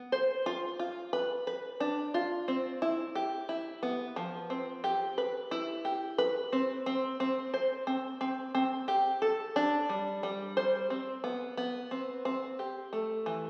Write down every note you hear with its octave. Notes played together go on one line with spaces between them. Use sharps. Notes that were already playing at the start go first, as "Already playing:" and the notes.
Already playing: B3
C5
F4
F4
B4
B4
D4
F4
C4
E4
G4
E4
B3
F3
C4
G4
B4
E4
G4
B4
C4
C4
C4
C5
C4
C4
C4
G4
A4
D4
G3
G3
C5
C4
B3
B3
C4
C4
G4
A3
E3